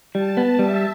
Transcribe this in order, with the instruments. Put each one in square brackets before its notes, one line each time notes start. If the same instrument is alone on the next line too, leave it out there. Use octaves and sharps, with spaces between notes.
[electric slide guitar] G3 [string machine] A5
[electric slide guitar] B3
[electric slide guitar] G3 [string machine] E5